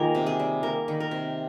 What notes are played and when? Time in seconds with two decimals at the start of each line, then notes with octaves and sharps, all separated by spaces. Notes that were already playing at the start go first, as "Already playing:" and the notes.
Already playing: D#3 A#3 F4 G#4 A#4
0.15 C3
0.26 G#4
0.39 G3
0.63 A#3 A#4
0.88 D#3
1.00 A#4
1.11 C3